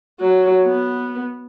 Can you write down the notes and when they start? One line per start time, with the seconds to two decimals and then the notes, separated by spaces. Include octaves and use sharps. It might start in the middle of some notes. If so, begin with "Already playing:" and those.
0.20 F#3
0.64 B3